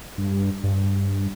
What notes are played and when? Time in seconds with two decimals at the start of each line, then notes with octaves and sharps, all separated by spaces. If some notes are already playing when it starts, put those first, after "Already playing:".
0.18 G2
0.63 G2